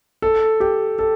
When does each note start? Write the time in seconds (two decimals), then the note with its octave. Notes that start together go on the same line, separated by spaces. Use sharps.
0.22 A4
0.60 G4
0.99 A4